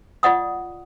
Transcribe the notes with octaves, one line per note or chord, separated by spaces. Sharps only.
F4 D5 D#5 F#5 C#6 D#6